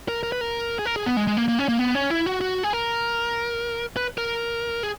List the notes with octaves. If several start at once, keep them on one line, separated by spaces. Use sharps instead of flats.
A#4
A#4
B4
A#4
G#4
A#4
G#4
B3
G#3
G#3
A#3
A#3
C#4
A#3
B3
C#4
E4
F#4
F#4
G#4
A#4
B4
A#4
G#4